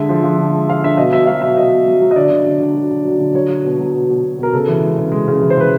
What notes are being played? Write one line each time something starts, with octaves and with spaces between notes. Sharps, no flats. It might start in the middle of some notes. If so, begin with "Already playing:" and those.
Already playing: D3 G#3 E5
F3
F3
D3
G#3
F3 F5
D3 E5
B2 D#5
F#3 E5
F#3 F5
B2 E5
B2 D#5
B2
F#3
F#3
D#5
D3 D5
D3
D3
D3
F#3
D3
F#3
D3
F#3 C#5
F#3
B2
F#3
B2
B2
B2
B2 A#4
C#3 A4
E3
G#3
C#3
G#3
C#3
E3
C5
C#3 B4